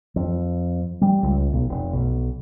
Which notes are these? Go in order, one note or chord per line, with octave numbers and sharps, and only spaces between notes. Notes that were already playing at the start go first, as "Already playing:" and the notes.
F2
G3
C#2
B1
F1
B1